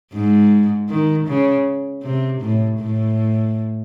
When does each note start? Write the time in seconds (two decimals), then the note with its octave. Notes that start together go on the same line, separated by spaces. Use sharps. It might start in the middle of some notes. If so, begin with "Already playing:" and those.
0.13 G#2
0.89 D#3
1.27 C#3
2.03 C3
2.41 A2
2.79 A2